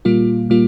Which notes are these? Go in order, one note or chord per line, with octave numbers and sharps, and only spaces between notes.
A#2 G3 A#3 F4
A#2 G3 A#3 F4